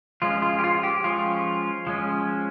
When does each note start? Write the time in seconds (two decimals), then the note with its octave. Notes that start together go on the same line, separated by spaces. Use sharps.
0.22 F3 G#3 C#4 F4
0.42 F4
0.59 G4
0.64 F4
0.83 G4
1.04 F3 G#3 C#4 F4
1.87 F3 G#3 C#4